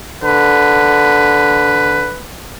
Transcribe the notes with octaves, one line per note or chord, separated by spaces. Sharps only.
D3 B4